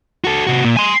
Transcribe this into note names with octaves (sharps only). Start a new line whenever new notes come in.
F#4 A4
C3 F#4
A#2
G#5 C6